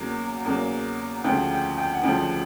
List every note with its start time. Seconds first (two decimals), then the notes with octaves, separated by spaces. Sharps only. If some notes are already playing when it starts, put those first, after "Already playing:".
Already playing: E2 C#3 F#3 A#3
0.45 E2 C#3 F#3 A#3
1.24 D2 C#3 F3 G5
1.51 G5
1.78 G5
1.93 F#5
2.03 D2 C#3 F3 G5